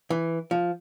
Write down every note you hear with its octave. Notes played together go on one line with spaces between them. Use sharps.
E3
F3